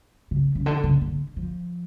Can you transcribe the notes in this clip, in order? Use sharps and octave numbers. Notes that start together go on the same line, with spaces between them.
C#3
C#3
D3
C#3
D3
F3